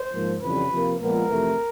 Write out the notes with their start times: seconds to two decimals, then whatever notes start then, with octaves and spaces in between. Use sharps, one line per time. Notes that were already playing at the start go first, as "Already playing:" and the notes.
Already playing: C5
0.12 G#2 F3 A#3
0.42 F2 C#3 E3 G3 B4
0.71 C3 F3 A#3
1.00 A#2 F3 G#3 B3 A#4
1.29 F2 C3 E3 A3